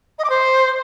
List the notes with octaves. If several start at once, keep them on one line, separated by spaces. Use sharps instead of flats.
D#5
D6
C5